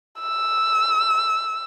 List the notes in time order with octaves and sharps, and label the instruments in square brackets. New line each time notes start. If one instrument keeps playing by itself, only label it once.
[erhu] E6